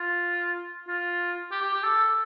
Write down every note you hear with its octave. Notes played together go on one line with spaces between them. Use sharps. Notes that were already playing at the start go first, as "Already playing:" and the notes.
Already playing: F4
F4
G4
G4
G4
A4